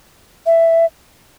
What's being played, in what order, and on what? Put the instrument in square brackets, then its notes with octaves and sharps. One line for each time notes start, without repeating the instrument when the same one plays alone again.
[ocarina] E5